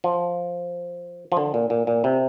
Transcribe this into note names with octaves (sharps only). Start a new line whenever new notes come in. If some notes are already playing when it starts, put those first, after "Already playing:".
F3
F3
D3
A#2
A#2
A#2
C3